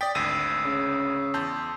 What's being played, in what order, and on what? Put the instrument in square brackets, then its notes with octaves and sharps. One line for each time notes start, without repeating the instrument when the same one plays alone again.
[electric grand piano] D5 G5 [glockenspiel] D#6 A6 B6
[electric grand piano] G#1 D2 D#7 [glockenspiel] E6 C7
[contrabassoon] C#3
[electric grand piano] E2 A5 G6 [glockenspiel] C6